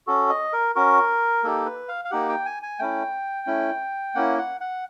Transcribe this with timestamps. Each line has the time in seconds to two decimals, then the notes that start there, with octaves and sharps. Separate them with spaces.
0.07 C#4 F#4 A4
0.29 D#5
0.53 A#4
0.75 C#4 F#4 A#4
1.44 A#3 D#4 G4 A4
1.66 B4
1.88 F5
2.05 F5
2.11 A#3 D#4 G4 F#5
2.29 G5
2.46 G#5
2.63 G#5
2.79 A3 C#4 E4 G5
3.47 A3 C#4 E4
4.15 A#3 C#4 E4 F#5
4.38 F#5
4.61 F#5